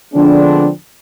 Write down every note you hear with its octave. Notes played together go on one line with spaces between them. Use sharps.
D3 F3 G#3 B3 C4 D4